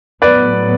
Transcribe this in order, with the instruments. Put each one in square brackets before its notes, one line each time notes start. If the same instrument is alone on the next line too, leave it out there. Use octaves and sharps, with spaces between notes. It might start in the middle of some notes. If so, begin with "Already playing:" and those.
[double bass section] A2 F#3 B3 [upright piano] B4 D5